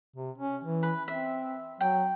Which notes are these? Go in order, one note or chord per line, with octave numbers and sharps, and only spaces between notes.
C3
C#4
E3
B4
C4 E5
F#3 G5